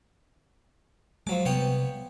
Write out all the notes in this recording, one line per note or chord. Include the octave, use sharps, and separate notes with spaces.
F3 F#3 G#3 D6
C3 G3 B3 C#5 G5